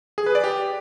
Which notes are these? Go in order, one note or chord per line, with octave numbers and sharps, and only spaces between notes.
G#4
B4
D5
G4